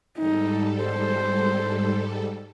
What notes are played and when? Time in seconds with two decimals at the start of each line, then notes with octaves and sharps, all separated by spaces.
0.18 G#2 G3 D#4 A4
0.83 C5